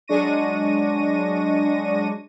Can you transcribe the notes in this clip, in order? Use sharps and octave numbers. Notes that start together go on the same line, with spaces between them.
F#3 G#3 D4 C#6 A#6 D#7